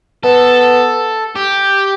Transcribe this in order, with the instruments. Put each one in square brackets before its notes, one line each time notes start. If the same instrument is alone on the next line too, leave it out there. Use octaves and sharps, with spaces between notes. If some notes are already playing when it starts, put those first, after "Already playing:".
[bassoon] B3 [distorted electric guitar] A4
[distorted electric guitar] G4